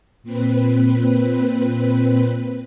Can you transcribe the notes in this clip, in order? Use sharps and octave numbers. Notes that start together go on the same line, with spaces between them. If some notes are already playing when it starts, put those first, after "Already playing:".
A#2 C4 B4